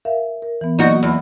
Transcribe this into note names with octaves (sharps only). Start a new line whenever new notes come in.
A#4 E5 F5
A#4
E3 B3
F#3 A#3 D#4 F#4
E2 D5 F#5 B5